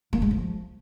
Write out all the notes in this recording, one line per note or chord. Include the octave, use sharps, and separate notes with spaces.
A#3
G#3
F3